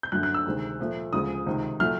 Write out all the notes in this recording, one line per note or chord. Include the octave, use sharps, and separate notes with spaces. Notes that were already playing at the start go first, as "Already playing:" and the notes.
G6
F#2 D3 F#3 A3 F#6
F#6
E6
D2 C3 D#3 G#3
A#2 F3 A3
D2 C#3 F3 G#3 D#6
C#2 C3 D#3
A#2 F#3 A3 F6